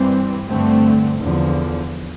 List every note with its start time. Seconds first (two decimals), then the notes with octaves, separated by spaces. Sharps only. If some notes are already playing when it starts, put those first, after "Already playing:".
Already playing: G2 E3 G3 C4
0.46 G2 D3 A3 C4
1.19 E2 D3 F3